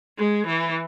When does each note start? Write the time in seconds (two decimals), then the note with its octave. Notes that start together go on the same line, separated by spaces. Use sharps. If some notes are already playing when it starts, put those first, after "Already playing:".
0.18 G#3
0.47 E3